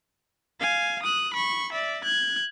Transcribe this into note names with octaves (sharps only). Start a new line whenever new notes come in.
F5 G#5
D#6 F#6
B5 C#6
D5 E5
F#6 G#6